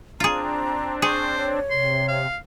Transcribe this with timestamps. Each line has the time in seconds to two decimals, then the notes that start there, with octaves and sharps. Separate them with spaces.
0.20 C4 D4 F4 G#4 A#5
1.02 G#4 C5 C#6
1.37 C#5
1.70 C3 C6
2.08 F5